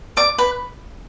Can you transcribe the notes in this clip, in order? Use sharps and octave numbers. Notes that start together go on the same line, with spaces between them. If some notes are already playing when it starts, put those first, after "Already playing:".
D5 D6
B4 B5